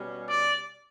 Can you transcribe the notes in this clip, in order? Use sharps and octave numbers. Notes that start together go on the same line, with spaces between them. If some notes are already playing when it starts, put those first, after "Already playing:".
Already playing: B2 G3 C#4
D5